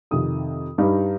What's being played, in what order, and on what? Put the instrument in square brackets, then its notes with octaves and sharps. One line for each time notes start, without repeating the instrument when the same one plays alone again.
[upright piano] F2 C3 D#3 D#6
G2 G3 D#4